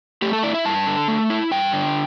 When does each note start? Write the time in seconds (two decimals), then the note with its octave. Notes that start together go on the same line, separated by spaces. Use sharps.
0.22 A3 G4
0.33 A4
0.43 E4 D5
0.54 E5
0.65 G2 A5
0.87 D3
1.08 A3
1.30 E4
1.51 G2 G5
1.73 D3